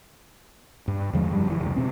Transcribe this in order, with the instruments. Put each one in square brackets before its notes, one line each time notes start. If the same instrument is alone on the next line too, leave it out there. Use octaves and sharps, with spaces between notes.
[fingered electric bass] G2
E2 D3 F3 G#3
E1 F#2 G3
F#1 E3
F1 C#2
B2 C4